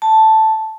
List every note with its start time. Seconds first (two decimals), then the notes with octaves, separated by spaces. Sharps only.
0.02 A5